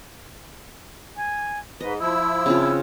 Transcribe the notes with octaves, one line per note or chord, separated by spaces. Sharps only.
G#5
G#2 B4 D#5
F3 E4 E6
C#3 C4 F4